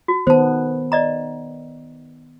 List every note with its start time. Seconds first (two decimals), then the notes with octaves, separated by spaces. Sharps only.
0.08 F#4
0.27 D#3 B3 C5 A5
0.92 D5 D#5 A#5